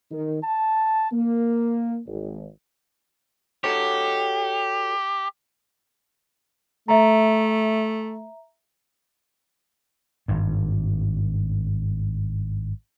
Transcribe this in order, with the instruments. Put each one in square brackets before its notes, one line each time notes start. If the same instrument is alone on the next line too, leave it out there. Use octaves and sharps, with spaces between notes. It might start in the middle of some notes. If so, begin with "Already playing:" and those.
[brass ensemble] D#3
A5
A#3
G#1
[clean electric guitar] F#4 A4 C#5 [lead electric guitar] G4
[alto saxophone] A3 [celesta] E5 A#5
[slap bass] G#1 G2